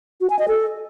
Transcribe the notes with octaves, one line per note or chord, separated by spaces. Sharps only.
F#4
G#5
D#5
A4